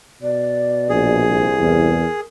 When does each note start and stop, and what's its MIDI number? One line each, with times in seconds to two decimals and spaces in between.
0.22 1.28 47
0.22 1.13 74
0.89 1.46 34
0.89 2.20 68
1.29 1.98 36
1.29 1.55 72
1.60 2.05 40
1.60 2.24 70